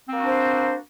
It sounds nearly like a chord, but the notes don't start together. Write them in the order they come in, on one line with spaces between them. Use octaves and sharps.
C4 A#3 F#4 D4 C5